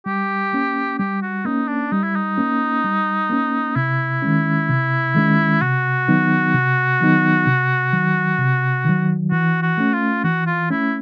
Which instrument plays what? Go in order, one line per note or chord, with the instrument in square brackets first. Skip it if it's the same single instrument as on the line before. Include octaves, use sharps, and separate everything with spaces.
[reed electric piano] G3 [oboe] G4
[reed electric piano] A#3 C#4
[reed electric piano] G3 [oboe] G4
[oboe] F#4
[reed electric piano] A#3 C#4 [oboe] D#4
[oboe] D4
[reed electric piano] G3 [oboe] D#4
[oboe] E4
D#4
[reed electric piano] A#3 C#4
G3
A#3 C#4
[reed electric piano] C3 [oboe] E4
[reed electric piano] D#3 G#3 C#4
C3
D#3 G#3 C#4
[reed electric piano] C3 [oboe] F#4
[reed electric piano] D#3 F#3 B3 D#4
C3
D#3 F#3 B3 D#4
C3
D#3 F#3
C3
D#3 F#3
[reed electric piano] E3 [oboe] F#4
[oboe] F#4
[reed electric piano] A3 C#4
[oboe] F4
[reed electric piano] E3 [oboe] F#4
[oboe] F4
[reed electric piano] A3 C#4 [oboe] E4